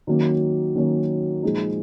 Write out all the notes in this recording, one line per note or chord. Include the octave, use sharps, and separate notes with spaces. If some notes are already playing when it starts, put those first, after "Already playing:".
D#3 F#3 A#3 C#4
D#3 F#3 A#3 C#4
A#2 F3 G#3 D#4